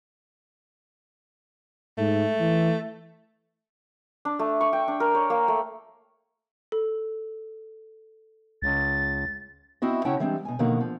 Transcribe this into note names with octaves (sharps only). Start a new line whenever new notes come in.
G#2 A3
E3
D4
A3
C#6
G5
D4
A#4
C#5
A#3
A3
A4
C#2 A6
C4 E4 F#4 D#5
C#3 C#4 E4 F#5 G5 A5
E3 G3 G#3 C4 D4
B2 G#5
B2 D3 D#3 F3 A#3 F#4
F3